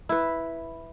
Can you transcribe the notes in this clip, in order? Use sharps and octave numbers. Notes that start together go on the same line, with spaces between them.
E4 B4